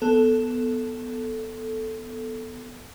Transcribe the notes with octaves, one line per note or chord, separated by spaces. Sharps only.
B3 A4